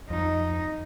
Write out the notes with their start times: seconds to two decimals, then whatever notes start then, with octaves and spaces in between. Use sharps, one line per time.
0.10 F2 D#4